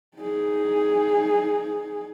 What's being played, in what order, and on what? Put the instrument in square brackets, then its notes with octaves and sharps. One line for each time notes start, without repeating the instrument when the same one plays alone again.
[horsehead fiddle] D#4 G#4